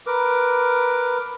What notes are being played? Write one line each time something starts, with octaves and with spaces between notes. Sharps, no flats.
A#4 B4 D6